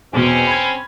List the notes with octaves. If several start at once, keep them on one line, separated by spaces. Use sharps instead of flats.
E2 B2 C4 C#4
B5 G#6